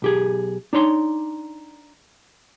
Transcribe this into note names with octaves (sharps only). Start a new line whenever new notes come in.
B1 G4 G#4
D4 D#4 C#5 C6